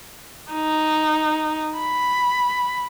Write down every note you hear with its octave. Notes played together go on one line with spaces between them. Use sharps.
D#4
B5